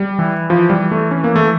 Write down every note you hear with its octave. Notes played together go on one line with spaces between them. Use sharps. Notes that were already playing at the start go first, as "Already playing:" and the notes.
Already playing: G3
E3
E3 F3
G3
A3
C#4
A#3
A3